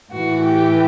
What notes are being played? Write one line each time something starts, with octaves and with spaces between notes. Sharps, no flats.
A2 E3 F#4
G4